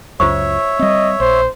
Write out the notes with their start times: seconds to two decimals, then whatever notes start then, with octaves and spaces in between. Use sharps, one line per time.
0.20 C#2 F#2 F4 C5 C#5 E5 C#6
0.79 G3 C4 D#5
1.20 A#1 C5